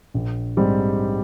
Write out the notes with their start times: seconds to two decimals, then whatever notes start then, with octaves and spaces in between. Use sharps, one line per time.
0.14 A#1
0.57 G#2 G3 C4 G4